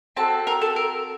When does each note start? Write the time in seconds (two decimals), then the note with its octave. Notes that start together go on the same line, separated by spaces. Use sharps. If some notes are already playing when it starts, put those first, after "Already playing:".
0.16 C4 F#4 A4 A5
0.47 A#4
0.62 A4
0.76 A#4